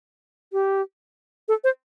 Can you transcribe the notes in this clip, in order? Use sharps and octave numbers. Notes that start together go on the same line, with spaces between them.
G4
A4
C5